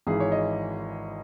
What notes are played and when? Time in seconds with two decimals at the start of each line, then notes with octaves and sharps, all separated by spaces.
0.07 G#1 G#2 E3 G#4
0.20 C#5
0.32 D#5